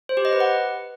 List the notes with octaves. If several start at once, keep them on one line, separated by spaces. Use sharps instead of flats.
C5
G4
D#5
B4
F#5